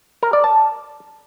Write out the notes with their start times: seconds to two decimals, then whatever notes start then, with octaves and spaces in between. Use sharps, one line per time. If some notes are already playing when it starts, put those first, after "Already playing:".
0.23 A#4
0.33 D5
0.44 A5